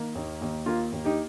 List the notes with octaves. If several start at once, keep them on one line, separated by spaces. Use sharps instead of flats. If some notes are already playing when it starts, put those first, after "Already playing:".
Already playing: D#3 A#3
D#2
D#2
A#3 F4
D#2
D#4 G4